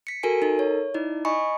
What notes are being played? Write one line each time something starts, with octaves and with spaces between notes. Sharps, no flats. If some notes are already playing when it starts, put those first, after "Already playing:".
B6 C#7
F#4 A4 A#4 G#5 D7
D#4 A4 A#4
C#5
D#4 E4 D5
D#5 G#5 B5 C#6 C#7